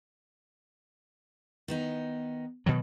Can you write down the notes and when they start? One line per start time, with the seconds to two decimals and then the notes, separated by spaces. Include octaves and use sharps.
1.68 D#3 B3 D#4
2.66 B2 D#3 F#3